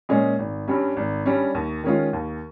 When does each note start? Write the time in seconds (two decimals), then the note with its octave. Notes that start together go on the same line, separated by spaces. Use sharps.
0.09 A#2 G#3 C#4 G#4
0.39 G#1
0.68 G2 G3 C#4
0.97 G#1
1.26 G2 G3 C#4
1.55 D#2
1.83 D#3 G#3 C#4 F4
2.13 D#2